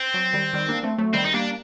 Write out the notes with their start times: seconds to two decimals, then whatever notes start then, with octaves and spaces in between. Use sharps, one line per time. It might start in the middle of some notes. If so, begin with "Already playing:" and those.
Already playing: C4
0.14 F#3
0.33 D#3 G3
0.53 D#3 G3
0.69 A#3 D4
0.83 A3 C4
0.98 F#3 A3
1.14 D#3 G3 C4
1.25 D#4
1.33 G3 A#3 D4